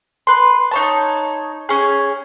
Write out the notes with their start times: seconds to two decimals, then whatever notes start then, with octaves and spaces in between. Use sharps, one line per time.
0.27 B4 C6
0.71 D#4 C#5 A5
1.69 C#4 G#4